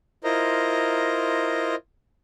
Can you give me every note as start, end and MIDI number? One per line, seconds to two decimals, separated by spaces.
0.24 1.75 64
0.24 1.75 65
0.24 1.75 70
0.24 1.75 72
0.24 1.75 75
0.24 1.75 82